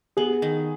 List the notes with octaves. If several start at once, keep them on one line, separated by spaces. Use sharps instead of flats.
B3 G#4
D#3